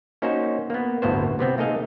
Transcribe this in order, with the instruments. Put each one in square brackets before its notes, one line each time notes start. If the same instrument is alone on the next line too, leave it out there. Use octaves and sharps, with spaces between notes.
[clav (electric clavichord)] A#3 C#4 D#4 F#4 C5
A#3 B3
G1 D2 A2 A#3 B3 C5
C3 B3 C4
A3 A#3 D#4 G#4 D#5 F5